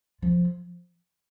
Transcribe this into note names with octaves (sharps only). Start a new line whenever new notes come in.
F3